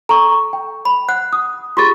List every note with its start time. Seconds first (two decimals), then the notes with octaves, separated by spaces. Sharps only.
0.09 A4 A#5 C#6
0.53 G5
0.85 B5
1.09 F#5 F#6
1.33 D#6
1.77 F4 G4 G#4 C6 C#6 A6